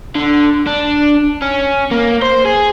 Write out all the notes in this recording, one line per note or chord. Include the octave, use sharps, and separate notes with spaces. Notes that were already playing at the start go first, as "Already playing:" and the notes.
D3
D4
C#4
A#3
C5
G#4